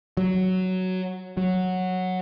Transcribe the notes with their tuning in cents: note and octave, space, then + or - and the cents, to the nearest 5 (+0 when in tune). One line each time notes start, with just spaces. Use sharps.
F#3 +5
F#3 -5